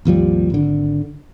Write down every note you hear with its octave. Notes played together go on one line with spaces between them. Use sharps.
G#1 D#2 F3 G3
G#1 D3